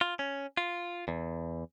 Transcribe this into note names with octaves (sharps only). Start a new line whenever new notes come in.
F4
C#4
F4
E2